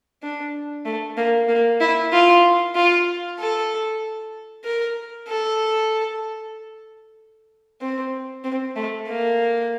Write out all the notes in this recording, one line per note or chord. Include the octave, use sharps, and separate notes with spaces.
D4
A3
A#3
A#3
E4
F4
F4
A4
A#4
A4
C4
C4
A3
A#3